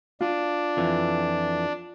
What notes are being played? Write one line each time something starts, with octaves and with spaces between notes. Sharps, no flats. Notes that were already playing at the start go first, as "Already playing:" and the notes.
D4 F4
F2 E3